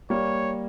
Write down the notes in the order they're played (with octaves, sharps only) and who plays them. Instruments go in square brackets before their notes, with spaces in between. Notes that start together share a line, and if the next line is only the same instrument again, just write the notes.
[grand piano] G3 A#3 [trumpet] C#5